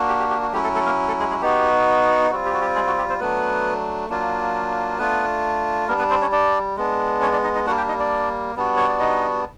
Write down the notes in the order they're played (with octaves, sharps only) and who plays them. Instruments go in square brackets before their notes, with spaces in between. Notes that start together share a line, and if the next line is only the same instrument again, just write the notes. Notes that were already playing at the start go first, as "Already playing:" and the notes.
Already playing: [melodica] A#3 D4 F#4
G4
G4
G4
F#4
F#3 A3 C#4 E4 G4
A3 A4
A3 A4
A#3 A#4
A3 A4
G#3 G#4
G#3 G#4
B3 D#4 F#4 G4
G3 C4 F4 F#4
G4
F#4
G4
G#3 G#4
F#4
G4
C4 C5
F#3 A3 B3 D4 B4
F#3 A#3 D4 F4
A3 B3 D4 F4 B4
G3 A#3 B3 D4 A#4
B3 B4
C4 C5
C#4 C#5
D4 D5
G#3 B3 D4
C#4 C#5
D4 D5
D#4 D#5
D#4 D#5
G3 A#3 D4 F#4 F#5
G4 G5
D#4 D#5
D4 D5
G3 B3 D4 F#4
C#5
D5
D#4 D#5